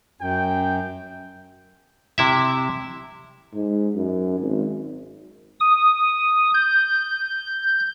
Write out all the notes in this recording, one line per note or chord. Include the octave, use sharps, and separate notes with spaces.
F#2 G5
C3 E4 E5
G#2
F#2
G#1
D#6
G6